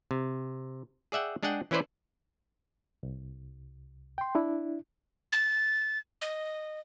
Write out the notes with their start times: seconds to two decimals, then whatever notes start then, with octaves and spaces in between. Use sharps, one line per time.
0.11 C3
1.12 G#4 D5 E5 F#5 G5
1.43 G#3 D4 G#4 F#5 G5
1.71 E3 C#4 E4 B4 C5 D5
3.03 C2
4.18 G5 C6
4.35 D4 E4
5.32 A6
6.22 D#5